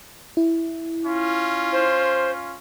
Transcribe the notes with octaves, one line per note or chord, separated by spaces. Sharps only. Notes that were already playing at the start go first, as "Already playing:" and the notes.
E4
C#4 F4
C5